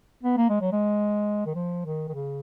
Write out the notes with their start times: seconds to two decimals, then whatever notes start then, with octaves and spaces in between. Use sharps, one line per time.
0.23 B3
0.37 A#3
0.49 G#3
0.61 F#3
0.72 G#3
1.46 D#3
1.55 F3
1.85 D#3
2.08 D#3
2.14 C#3